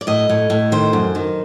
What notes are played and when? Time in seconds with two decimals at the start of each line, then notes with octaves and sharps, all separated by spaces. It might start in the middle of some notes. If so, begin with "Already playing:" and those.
0.01 D5
0.07 A2 D#5
0.29 A2
0.50 A2
0.72 D#3 C5
0.93 F#2
1.15 D#3